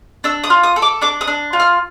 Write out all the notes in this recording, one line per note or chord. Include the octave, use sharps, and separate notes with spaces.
D4 E6
D#6
F4
D#6
A4
D6
D4 D6
D#6
D4
F4
F6